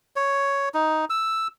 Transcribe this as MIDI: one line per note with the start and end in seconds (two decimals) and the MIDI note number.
0.16 0.69 73
0.74 1.05 63
1.10 1.48 88